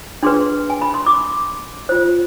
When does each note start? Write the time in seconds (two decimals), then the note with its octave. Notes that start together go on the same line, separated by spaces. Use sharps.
0.23 D4 G#4 B4 C6
0.70 G#5
0.81 B5
0.94 C6
1.06 D6
1.89 F4 C5